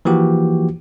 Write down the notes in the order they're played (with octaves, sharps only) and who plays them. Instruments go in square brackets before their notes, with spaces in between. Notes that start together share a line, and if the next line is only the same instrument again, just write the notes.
[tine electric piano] E3 F3 A#3 F#4 G4